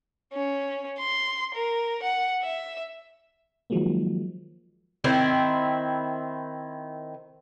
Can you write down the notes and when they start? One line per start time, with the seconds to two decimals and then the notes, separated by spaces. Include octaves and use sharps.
0.33 C#4
1.00 C6
1.55 A#4
2.03 F#5
2.43 E5
3.70 D#3 F3 F#3 G#3 A#3
5.04 D#3 C4 E4